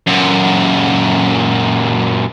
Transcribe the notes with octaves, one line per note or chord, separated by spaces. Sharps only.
F#2 A#2